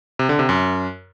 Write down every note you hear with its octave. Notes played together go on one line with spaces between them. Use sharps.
C3
D3
C3
F#2